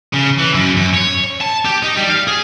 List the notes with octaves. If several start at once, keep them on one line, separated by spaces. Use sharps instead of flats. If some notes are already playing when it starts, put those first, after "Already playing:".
C#3
E3
F#2
F#2
C#5
A5
G4
D#4
G3
F5
G#4